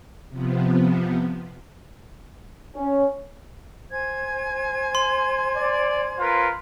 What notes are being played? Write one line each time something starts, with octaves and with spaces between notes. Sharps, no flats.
C3 F3 B3
C#4
C5 G#5 G#6
C6
D5
F4 A#4 B4